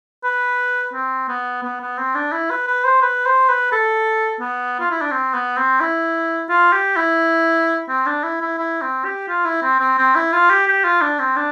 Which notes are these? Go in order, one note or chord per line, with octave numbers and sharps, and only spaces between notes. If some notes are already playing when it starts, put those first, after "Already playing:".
B4
C4
B3
B3
B3
C4
D4
E4
B4
B4
C5
B4
C5
B4
A4
B3
F4
E4
D4
C4
B3
C4
E4
F4
G4
E4
C4
D4
E4
E4
E4
C4
G4
F4
E4
C4
C4
C4
E4
F4
G4
G4
F4
D4
C4
D4